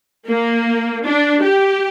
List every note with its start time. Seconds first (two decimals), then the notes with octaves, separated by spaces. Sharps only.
0.28 A#3
1.04 D4
1.42 G4